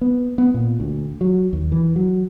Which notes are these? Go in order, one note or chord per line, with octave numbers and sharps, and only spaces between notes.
B3
B3
A#2
D2
F#3
D#2
E3
F#3